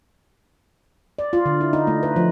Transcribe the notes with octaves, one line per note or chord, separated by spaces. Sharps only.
D5
F4
D3
E4
D#4
A3
B4
F3